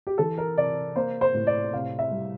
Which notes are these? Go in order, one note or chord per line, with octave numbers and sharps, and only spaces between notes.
G4
E3 A4
A#4
C3 D5
A#3 C5
C5
A2
D5
C3 F5
E5
G3